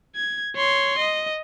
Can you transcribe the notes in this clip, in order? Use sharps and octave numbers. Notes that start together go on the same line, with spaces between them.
G#6
C#5 C6
D#5